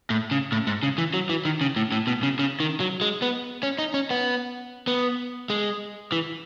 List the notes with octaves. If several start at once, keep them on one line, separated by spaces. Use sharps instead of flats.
A2
C#3
A2
G#2
C#3
E3
F#3
E3
D#3
C#3
A2
A2
B2
C#3
C#3
D#3
F#3
G#3
B3
C#4
D#4
C#4
B3
B3
G#3
E3